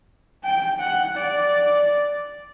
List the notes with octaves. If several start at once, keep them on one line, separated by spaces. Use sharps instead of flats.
G5
F#5
D5